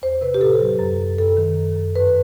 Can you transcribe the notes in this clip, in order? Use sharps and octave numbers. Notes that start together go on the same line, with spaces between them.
E2 C5
C3 B4
G4
A2 A4
F#3
F#2
F#2
F#2 A4
D#3
F#2
F#2
G2 B4